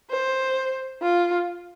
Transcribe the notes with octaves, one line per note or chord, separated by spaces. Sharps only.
C5
F4